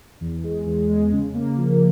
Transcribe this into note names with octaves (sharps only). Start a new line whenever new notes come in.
E2
G#3
E2
G#3
C#3
A#3
F3